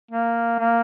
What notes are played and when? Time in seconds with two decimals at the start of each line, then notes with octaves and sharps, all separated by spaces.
0.11 A#3
0.59 A#3